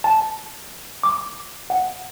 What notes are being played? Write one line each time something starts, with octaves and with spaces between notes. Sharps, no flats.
A5
D6
F#5